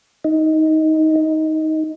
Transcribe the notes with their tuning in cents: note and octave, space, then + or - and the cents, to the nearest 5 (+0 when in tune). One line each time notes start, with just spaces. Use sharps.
D#4 +15
D#4 +15